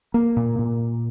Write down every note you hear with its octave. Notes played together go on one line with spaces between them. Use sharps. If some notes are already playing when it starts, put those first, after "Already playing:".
A#3
A#2
A#2